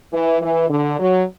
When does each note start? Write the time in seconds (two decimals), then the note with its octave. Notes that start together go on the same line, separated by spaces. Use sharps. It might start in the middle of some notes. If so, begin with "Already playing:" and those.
0.13 E3
0.42 E3
0.70 D3
0.99 F#3